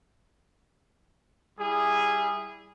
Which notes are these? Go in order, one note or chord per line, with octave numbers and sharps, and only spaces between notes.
G3 E4 G#4